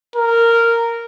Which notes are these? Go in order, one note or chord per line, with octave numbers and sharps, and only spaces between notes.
A#4